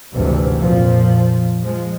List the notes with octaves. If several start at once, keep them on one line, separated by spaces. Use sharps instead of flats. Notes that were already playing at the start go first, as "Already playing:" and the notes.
G#1 D2 C3 E3
F2 A#2 F3
F3 G#3